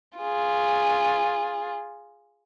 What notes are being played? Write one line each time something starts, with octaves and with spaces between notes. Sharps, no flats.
F4 G#4